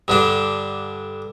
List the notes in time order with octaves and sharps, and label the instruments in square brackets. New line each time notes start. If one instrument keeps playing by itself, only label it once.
[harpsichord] G2 D3 D4